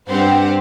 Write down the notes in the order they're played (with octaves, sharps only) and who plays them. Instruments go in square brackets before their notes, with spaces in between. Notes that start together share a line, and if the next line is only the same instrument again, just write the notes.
[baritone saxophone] G2 [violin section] C4 G4 C5 F#5